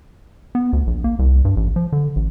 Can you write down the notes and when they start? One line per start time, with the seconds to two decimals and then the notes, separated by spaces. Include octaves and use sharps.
0.55 B3
0.73 D2
0.87 A#1
1.04 A#3
1.19 C2
1.45 G2
1.57 A1
1.76 F3
1.92 D3
2.16 A1